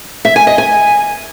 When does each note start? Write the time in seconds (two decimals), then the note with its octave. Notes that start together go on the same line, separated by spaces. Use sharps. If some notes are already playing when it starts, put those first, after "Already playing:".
0.25 E5
0.36 G#5
0.47 D#5
0.58 G#5